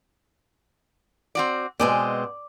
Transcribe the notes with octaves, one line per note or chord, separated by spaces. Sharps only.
C4 F#4 D5
B2 G#3 C4 D5